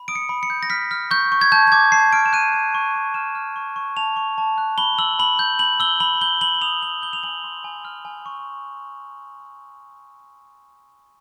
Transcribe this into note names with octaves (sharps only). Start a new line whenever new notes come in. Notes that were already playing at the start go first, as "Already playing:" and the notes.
Already playing: B5
D#6 D7
C#7
B5
C#7
G6
A#6
F6 B6
F6
C#6 G6
C#6
G#6
A5 G6
G6
D6 G#6
A5 C7
F6 D7
E7
F#6 D#7
F#6
C#6
C#6
F6 E7
F6
C#6
C#6
A5 F7
C#6
A5
F#6
B5 G7
E6 F#7
B5 F#7
G6
B5 F#7
E6 G7
B5 F#7
G6 G7
B5 F#7
D#6 F7
B5 F#7
G6 G7
F7
G#5 F#7
C6
G#5
F6
G#5
C#6